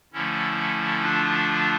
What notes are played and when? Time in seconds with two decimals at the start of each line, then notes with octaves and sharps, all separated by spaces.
0.13 D3 F3 A3 C#4 E4
1.02 D4 F4